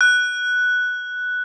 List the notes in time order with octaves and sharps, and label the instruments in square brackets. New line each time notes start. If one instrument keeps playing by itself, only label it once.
[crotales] F#6